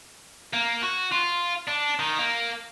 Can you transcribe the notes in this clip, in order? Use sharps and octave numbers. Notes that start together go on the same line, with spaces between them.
A#3
F#4
F4
D4
D#3
A#3